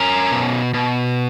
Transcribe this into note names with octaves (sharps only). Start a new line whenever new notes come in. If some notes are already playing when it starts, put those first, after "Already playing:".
Already playing: C#4 A#4
B2
B2